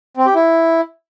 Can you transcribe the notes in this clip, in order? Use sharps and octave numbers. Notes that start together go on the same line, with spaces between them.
C4
G4
E4